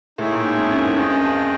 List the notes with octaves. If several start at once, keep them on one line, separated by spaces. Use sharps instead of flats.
A2 D#4 G#4 C#5 E5 G5
A#2
G#2
F2
F#2
G#2
G2 G#4 C5 D#5 G5
F#2
F2